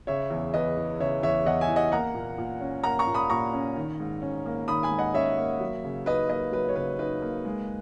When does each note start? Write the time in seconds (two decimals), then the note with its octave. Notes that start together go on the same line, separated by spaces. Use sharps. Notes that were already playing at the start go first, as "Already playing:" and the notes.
0.07 C#3 C#5 E5
0.30 E2
0.54 E2 B4 D#5
0.77 E3
1.00 C#3 C#5 E5
1.23 E2 C#5 E5
1.46 E2 D#5 F#5
1.61 E5 G#5
1.68 E3
1.76 D#5 F#5
1.92 A#3 F#5 A#5
2.14 A#2
2.38 A#2
2.61 C#4
2.84 A#3 F#5 A#5
2.99 A#5 C#6
3.07 A#2
3.14 B5 D#6
3.30 A#2 A#5 C#6
3.53 C#4
3.76 D#3
4.00 G#2
4.22 C#4
4.46 A#3
4.68 D#3 B5 D#6
4.83 G#5 B5
4.91 G#2
4.99 D#5 F#5
5.14 C#4 C#5 E5
5.38 A#3
5.60 F#3
5.84 C#3
6.06 D#4 B4 D#5
6.29 A#3 B4 D#5
6.52 F#3 B4
6.69 C#5
6.75 C#3 B4
6.99 D#4 B4
7.22 A#3
7.45 G#3